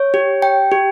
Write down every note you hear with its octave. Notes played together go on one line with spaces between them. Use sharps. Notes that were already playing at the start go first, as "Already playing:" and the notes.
Already playing: C#5
G4
G5
G4